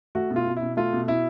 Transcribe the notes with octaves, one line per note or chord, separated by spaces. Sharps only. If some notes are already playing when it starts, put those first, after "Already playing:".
A3 F#4
B2
F4
B2
E4
B2
A3 F4
B2
B2 E4